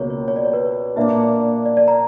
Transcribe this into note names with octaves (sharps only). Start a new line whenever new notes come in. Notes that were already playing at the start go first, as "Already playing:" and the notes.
Already playing: C#2 B2 A#3 C#5
C#5
C#5
D5
C#5
B4
A#2 A#3 D4 E5
D5
D5
A#5